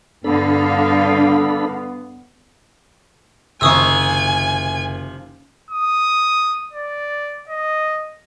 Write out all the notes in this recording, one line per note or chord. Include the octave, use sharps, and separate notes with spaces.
G2 D3 B3 D4 A4 F5 B5
F#1 C3 D#3 F3 G#5 C#6 D#6 E6
D#6
D5
D#5